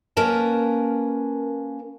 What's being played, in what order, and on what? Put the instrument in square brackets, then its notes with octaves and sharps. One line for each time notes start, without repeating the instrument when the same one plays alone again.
[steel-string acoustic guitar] A#3 C#4 A#4 B4 A5